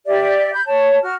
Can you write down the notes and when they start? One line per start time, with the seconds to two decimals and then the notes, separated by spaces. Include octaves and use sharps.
0.06 G4 D5 E5
0.53 B5 G6
0.66 C#5 A5
1.03 F#4 F6